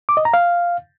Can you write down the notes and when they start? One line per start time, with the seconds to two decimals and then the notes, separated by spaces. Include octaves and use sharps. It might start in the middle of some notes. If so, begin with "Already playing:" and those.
0.09 D6
0.17 D#5
0.25 A#5
0.34 F5